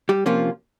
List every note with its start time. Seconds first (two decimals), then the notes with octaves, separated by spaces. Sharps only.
0.09 G3 G4
0.26 C3 F3 A#3 C#4 F4